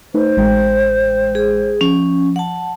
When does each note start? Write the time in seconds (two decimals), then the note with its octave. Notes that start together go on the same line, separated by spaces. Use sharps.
0.14 A3 D#4 B4 C5
0.37 A1 G#3 G5
1.35 G#4
1.81 F3 C#4
2.36 F#5 A5